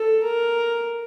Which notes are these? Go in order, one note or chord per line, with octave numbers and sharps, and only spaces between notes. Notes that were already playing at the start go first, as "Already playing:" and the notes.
Already playing: A4
A#4